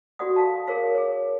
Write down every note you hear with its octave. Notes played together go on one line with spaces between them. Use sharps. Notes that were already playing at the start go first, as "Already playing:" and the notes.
F#4 G4 A4 D5 F#5 D#6
A4 F5 A5
G#4 A#4 C#5 F5
G#4 C#5